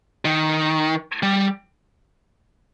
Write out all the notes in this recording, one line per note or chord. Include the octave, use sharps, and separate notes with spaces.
D#3
G3